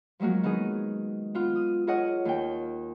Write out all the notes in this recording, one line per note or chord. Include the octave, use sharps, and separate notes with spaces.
F3 F#3 G#3 A#3 F#4
D#3 B3 D#4 G#4 D#5
B3 F4
D#6
F4 G#4 A#4 C#5 D#5 F#5
D#2 G5